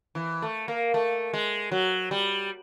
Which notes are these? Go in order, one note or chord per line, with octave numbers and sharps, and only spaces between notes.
E3
A3
A#3
A3
G#3
F#3
G3